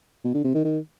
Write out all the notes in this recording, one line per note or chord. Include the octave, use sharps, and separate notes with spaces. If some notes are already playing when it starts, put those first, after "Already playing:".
B2
D3
C3
D#3
D#3